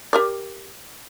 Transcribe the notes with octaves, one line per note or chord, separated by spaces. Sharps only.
G4 A#4 D5